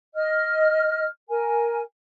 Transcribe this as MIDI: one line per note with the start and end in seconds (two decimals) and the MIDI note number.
0.15 1.05 75
0.15 1.05 89
1.29 1.80 70
1.29 1.80 80